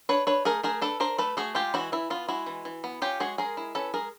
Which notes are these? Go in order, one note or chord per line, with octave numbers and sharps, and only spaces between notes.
D4 B4 C#5
D4 B4 C#5
A3 G#4 A#4
A3 G#4 A#4
D4 A4 B4
D4 A#4 C5
A3 A4 B4
A3 F#4 G#4
G#3 F4 G4
E3 E4 F#4
E3 E4
B3 F4
G#3 E4 F#4
E3
E3
B3
C#4 F4 G4
G#3 F#4 G#4
G#3 G#4 A#4
E4
C#4 A4 B4
G#3 G#4 A#4